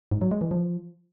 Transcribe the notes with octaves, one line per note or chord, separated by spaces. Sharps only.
G#2
F#3
G#3
E3
F3